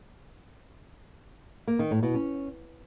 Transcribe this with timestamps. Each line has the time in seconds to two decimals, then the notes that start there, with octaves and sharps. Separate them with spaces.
1.67 A#3
1.79 D#3
1.91 A2
2.03 B2
2.14 C#4